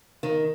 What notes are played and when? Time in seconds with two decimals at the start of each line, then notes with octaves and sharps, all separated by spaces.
0.23 D#3